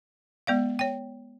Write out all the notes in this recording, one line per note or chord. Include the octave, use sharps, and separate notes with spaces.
G#3 B3 D5 F5
C#5 G5